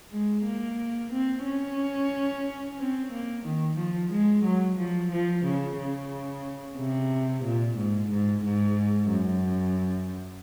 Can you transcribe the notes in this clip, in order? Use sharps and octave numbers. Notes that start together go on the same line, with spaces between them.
G#3
A#3
C4
C#4
C4
A#3
D#3
F3
G#3
F#3
F3
F3
C#3
C#3
C3
A#2
G#2
G#2
G#2
F#2